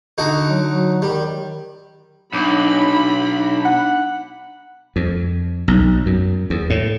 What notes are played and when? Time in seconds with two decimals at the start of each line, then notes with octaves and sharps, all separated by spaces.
0.18 D3 D#4 F#4
0.50 F#3
0.66 F#3
1.02 D#3 G3
2.33 B1 D4 D#4 B5 D6
3.65 F#5
4.96 F2
5.68 B1
6.06 F#2
6.50 E2
6.70 A2